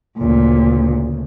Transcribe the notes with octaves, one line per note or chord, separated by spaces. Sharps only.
D2 A#2 C#3